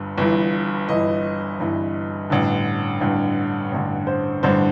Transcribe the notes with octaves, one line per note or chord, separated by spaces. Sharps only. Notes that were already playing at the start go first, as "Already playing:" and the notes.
Already playing: G1 G2
G1 G2 E3
G1 G2 E3 D#5
G1 G2 E3
A1 G2 D3
A1 G2 D3
A1 G2 D3
C5
A1 G2 D3 C5